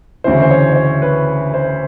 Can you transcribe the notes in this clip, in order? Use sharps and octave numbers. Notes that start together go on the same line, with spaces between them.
D2 C#3 E3 C5
C5
C#5
C#5
C5
B4
C5